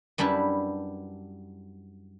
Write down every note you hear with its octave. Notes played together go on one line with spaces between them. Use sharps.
F#2 G3 D4 E4 B4